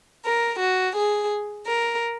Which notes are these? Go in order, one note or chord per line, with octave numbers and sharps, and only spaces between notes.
A#4
F#4
G#4
A#4